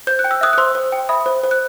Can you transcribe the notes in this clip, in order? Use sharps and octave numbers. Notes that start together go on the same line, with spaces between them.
C5 G6
F#6
G5
E6
E5 D#6 F#6
F#6
C5 C6 E6
C5
G5
E5 B5 D#6
C5
C5
F#6